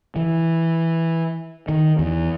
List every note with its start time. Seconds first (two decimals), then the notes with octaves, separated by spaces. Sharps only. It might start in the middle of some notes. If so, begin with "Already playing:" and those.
0.16 E3
1.69 D#3
1.99 E2